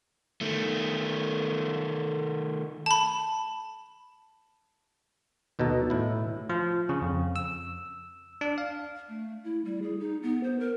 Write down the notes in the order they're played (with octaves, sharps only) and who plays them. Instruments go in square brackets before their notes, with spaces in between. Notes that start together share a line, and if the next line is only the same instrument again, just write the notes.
[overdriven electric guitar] D#3 A3
[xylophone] A5 B5
[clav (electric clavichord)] D#2 B2 D#4 A4 A#5
A2 E4
[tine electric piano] F3
C#3
F2
E6
D4
F5
[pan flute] A3
E4
G3
G#4
D#4
B3
C5
A#4